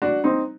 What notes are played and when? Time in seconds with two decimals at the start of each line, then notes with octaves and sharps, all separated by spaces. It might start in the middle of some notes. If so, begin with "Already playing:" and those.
0.02 D4 F#4
0.24 C4 D#4